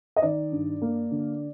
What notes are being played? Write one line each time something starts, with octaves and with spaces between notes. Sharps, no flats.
D#5
D#3 D5
G2
A#3
D3